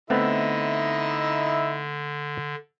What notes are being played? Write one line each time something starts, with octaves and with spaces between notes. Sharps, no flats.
D3 A3 B3 C4 D#4 E4 D#5 E5